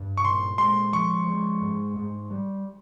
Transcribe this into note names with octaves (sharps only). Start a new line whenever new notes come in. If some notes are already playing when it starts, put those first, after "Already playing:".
Already playing: G2
C#6
A#2 C6
G#3 C6
F3 C#6
G#3
G#2
G#2
G3